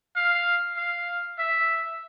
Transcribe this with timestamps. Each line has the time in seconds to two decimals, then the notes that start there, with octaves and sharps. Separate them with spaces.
0.16 F5
0.77 F5
1.39 E5